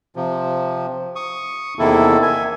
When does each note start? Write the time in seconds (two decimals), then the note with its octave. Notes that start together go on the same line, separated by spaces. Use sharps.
0.16 C3 F3
1.16 C#6 D#6
1.79 E2 C3 D#3 A#3 E4 A4
2.22 E5 G#5